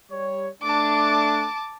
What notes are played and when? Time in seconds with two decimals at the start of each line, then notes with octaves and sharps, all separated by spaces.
0.11 G3 C#5
0.62 A3 D4 A5 D6